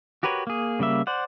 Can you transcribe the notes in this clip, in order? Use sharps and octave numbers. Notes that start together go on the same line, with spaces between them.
F#4 G4 A#4 B4 C#5
A#3 G#4
C#3 G3 A#3 E5
C5 D5 F#5